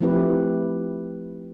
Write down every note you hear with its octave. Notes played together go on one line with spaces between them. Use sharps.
F3 A3 C4 E4 G4 B4